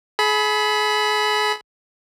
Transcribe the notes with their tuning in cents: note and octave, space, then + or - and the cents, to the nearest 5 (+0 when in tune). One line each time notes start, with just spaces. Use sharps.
G#4 +35 B5 +0